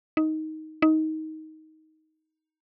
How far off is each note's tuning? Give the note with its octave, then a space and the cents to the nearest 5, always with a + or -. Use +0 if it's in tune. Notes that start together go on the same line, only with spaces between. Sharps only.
D#4 +10
D#4 +15